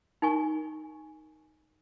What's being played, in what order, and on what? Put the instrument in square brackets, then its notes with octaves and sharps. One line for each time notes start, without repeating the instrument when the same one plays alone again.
[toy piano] D#4 A#4 G#5 C#6